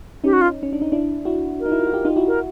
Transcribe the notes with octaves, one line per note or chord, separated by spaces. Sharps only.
C#4 D#4 G4
F#4
F4
C#4
D4
D#4
D4 E4
E4 F#4
A#4
D#4
E4
F4
F#4
F4 G4
D#4 F4
E4 F#4
A#4